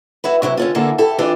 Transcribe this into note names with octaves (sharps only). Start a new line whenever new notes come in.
E4 F#4 B4
C3 F#3 E4 G4
D3 C#4 F4
D3 A#3 E4 F#4 G#4 A4
E4 G4 A4
F2 E3 D4 F4 G4 G#4